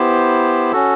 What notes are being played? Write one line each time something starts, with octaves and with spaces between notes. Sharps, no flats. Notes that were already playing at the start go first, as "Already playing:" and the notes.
Already playing: B3 E4 G4 C5
C#4 F#4 A4